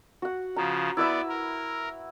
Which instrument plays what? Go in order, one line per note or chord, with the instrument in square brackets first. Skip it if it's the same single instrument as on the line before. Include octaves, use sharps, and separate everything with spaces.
[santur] F#4 F#5
[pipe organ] C#3 F3 [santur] A#5
[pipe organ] B3 D5 [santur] E4 B4 E5
[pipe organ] A#4